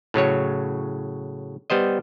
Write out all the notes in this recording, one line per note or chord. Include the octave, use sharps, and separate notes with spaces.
A2 C#3 F#3 C#5
G3 B3 C5 D#5